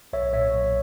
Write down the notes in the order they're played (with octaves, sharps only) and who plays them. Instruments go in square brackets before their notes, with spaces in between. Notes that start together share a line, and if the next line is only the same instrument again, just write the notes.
[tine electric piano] B1 C#5 E5
A#2 C#5 E5
B1